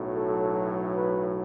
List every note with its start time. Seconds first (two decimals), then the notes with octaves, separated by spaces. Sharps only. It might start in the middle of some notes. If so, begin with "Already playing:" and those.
Already playing: B1 A2 F#3
0.13 A4
0.95 B4